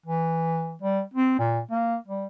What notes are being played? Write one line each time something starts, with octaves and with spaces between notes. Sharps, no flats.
E3
G3
C4
A#2
A#3
G3